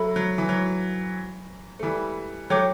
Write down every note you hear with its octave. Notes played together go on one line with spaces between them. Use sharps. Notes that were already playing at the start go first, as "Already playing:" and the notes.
Already playing: F#3 A4 E5 B5
F#3
E3
F#3
A3
E3 G3
F#3 A3 C#5 G5 D6 G6